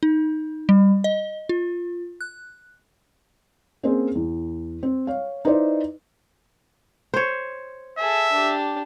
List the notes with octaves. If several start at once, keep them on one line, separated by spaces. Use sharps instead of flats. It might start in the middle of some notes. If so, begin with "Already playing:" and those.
D#4
G3
D#5
F4
F#6
A#3 C4 C#4 G#4 C5
E2
C4
C#5 F5
D#4 E4 B4 C5 D5 D#5
C5 C#5
G#4 A4 E5
D4 G4